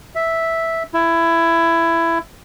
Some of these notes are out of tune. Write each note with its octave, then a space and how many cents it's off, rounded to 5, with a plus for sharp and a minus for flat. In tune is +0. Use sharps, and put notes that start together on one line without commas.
E5 -5
E4 +15